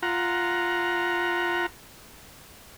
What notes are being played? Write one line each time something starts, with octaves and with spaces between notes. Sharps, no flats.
F4 F#5 A#5